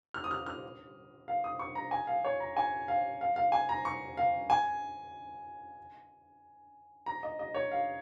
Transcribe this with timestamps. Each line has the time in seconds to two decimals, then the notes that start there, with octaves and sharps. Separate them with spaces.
0.14 F6
0.24 D#6
0.31 F6
0.46 F6
1.28 F5
1.44 D#6
1.59 C#6
1.75 A#5
1.91 G#5
2.07 F5
2.25 C#5
2.40 A#5
2.57 G#5
2.88 F5
3.21 F5
3.36 F5
3.52 G#5
3.69 A#5
3.85 C#6
4.17 F5
4.50 G#5
7.06 A#5
7.23 D#5
7.39 D#5
7.54 C#5
7.72 F5